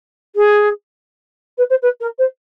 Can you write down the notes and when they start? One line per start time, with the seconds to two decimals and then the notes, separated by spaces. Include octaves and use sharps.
0.36 G#4
1.58 B4
1.70 C5
1.82 B4
2.00 A#4
2.18 C5